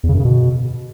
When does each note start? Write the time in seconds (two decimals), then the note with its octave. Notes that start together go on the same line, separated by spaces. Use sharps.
0.03 E2
0.09 C#3
0.14 F#2
0.20 C#3
0.25 B2